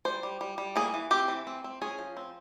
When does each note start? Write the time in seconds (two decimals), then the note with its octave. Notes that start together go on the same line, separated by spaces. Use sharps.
0.05 G3 C5
0.23 G3
0.41 G3
0.58 G3
0.76 A#3 G#4
0.94 E3
1.11 C4 G4
1.28 E3
1.47 C4
1.64 C4
1.82 C#4 G#4
1.98 F3
2.17 C4